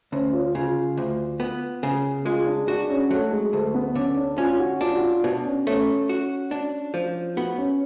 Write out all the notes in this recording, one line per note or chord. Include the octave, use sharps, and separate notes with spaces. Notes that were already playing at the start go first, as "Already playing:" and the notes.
D2 C#4
F4
C#3 F4
D2
B3
C#3
G#3 F4
D4
D4 F#4
C#4
F#3 A3
G#3
D2 A3
B3
D3 C#4
D4
C#4 F4
F#4
D4 F4
F#4
F4
B2 D4
C#4
A3 C#4
F#4
D4
F3
B3 F#4
C#4